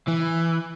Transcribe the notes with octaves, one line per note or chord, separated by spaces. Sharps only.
E3